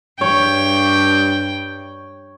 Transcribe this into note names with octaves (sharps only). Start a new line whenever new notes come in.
G2 C#5 G5